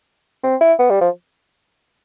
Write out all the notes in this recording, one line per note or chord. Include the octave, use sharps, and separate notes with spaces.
C4
E4
B3
G3
F3